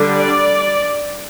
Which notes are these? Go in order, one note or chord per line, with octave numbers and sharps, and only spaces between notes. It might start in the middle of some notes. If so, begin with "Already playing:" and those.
Already playing: D3 G3 D4
D5